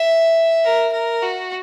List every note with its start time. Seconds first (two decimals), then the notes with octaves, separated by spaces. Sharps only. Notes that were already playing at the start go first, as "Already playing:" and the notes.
Already playing: E5
0.64 A#4
0.93 A#4
1.22 F#4